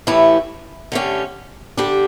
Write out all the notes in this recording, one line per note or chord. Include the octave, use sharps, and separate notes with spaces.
A2 E3 A3 E4 G4
D3 A3 C#4 G4
D3 G3 D4 G4